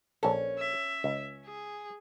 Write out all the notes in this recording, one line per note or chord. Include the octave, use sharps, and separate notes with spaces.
A#1 C#4 A4
E5
C#2
G#4